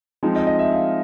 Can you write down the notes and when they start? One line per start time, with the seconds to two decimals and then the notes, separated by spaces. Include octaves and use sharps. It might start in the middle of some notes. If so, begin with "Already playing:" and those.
0.23 F3 G#3 C4 D#4
0.36 D#5
0.47 D#5
0.59 E5
0.72 F5